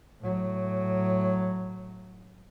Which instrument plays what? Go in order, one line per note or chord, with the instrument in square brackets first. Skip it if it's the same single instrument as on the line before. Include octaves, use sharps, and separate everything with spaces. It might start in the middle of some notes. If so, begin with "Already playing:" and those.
[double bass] A2 F#3